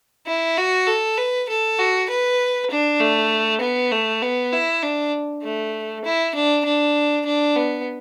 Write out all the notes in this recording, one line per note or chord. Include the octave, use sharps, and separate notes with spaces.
E4
F#4
A4
B4
A4
F#4
B4
D4
A3
B3
A3
B3
E4
D4
A3
E4
D4
D4
D4
B3